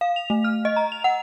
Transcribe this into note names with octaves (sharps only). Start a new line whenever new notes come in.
F5
F7
A3
F6
D#5
A#5
F7
F#5